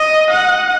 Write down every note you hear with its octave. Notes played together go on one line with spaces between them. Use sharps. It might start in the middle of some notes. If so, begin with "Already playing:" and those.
Already playing: D#5
F#5